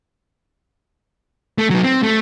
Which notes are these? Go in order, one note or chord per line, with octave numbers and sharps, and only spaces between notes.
A3
F#3 D#4
C4
A3